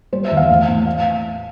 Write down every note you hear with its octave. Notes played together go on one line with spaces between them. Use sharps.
G3 C5
E5
E2
F5
A2
A2
F5